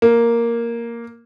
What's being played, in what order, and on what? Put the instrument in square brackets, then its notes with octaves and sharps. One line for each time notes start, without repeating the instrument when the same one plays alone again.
[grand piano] A#3